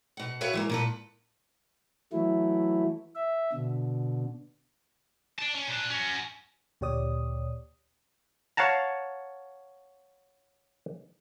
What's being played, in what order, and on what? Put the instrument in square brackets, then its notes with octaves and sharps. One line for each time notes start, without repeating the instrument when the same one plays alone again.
[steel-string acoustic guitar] B2 F#5
F#4 B4 C#5 E5 F5
E3 G#3 A#3
A#2 A4 B4
[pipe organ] E3 F#3 A3 E4
E5
B2 D3
[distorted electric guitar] D5 A5
C#4
A#2 D4
C#4 F#4
[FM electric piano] D2 A#2 G4 C#5 D5 D#6
[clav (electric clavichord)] C#5 F5 F#5 A5 A#5